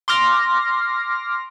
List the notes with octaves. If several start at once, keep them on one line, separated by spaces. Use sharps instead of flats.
C6 D6 F6 A#6